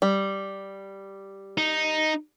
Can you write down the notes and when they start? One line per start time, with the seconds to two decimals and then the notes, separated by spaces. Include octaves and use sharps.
0.02 G3
1.58 D#4